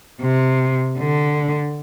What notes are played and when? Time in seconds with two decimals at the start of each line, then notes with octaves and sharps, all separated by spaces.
0.21 C3
0.99 D3